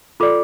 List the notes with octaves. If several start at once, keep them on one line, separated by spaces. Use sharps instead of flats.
F4 A4 D5 D6